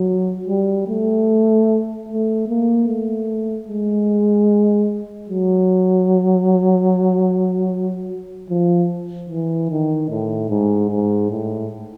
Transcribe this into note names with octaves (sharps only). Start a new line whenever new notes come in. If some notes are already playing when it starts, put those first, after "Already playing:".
Already playing: F#3
G3
A3
A3
A#3
A3
G#3
F#3
F3
E3
D#3
A2
G#2
G#2
A2